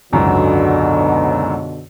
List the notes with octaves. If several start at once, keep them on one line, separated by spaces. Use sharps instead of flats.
G#1 C#2 F#2 B2 D3